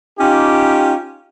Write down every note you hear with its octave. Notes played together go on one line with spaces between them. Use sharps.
C#4 D#4 F4 G4